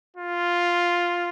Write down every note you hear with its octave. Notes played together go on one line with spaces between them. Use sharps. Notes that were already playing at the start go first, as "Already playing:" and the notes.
F4